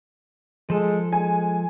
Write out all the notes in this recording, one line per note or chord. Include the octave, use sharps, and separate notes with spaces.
F3 G#3 A4
G#3 G#5